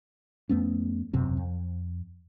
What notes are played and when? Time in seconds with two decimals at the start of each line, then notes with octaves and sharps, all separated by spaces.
0.49 F2 A3 B3 C#4
1.13 E1 F#2 C3 C4
1.37 F2